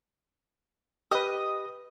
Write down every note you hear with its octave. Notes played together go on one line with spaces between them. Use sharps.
G4 B4 D#5 D#6